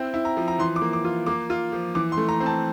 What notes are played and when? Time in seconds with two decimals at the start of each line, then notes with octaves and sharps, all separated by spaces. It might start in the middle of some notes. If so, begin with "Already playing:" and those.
Already playing: C4 E4 G5
0.14 E4
0.25 A#5
0.37 F3
0.48 A#5
0.59 E3 C6
0.76 D6
0.81 A#3
0.93 D6
1.05 F4
1.26 A#3 D6
1.50 F4
1.72 F3
1.95 E3 D6
2.12 C6
2.17 A3
2.29 A#5
2.40 C4
2.46 A5